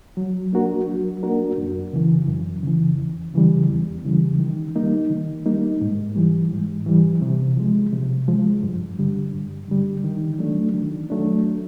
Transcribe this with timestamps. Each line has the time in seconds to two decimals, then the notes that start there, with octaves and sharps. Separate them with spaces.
0.17 F#3
0.53 A#3 D4 F#4 A#4
0.88 F#3
1.23 A#3 D4 F#4 A#4
1.58 F#2
1.93 C#3 E3
2.28 F#2
2.63 C#3 E3
2.98 E2
3.34 C#3 E3 G3
3.69 E2
4.04 C#3 E3 G3
4.39 D#3
4.76 G3 A#3 D#4
5.10 D#3
5.46 G3 A#3 D#4
5.81 G#2
6.16 E3 G3
6.52 G#2
6.86 E3 G3
7.22 C3
7.57 F3 G#3
7.93 C3
8.28 F3 G#3
8.63 G2
8.99 D3 G3
9.34 G2
9.68 D3 G3
10.04 D#3
10.39 F#3 A3 D4
10.74 D#3
11.10 F#3 A3 D4